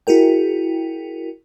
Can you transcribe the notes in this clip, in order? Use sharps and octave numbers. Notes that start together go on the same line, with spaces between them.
E4 F#4 G#4 A#4 G5